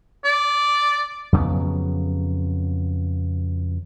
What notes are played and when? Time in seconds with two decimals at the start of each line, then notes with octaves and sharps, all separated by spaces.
0.24 D5
1.32 F2 C#3 F#3 B3